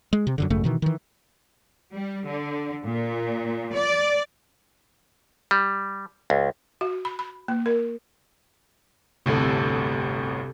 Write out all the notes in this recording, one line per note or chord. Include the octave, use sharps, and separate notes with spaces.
G#3
C3
F#2 B2 D3
G#1 F#2 C#3 A3
B2 D#3 E3
D#3 E3
G3
D3
A#2
D5
G3
C#2
F#4
B5
B5
A#3
A#4
G1 D2 A2 C3 A4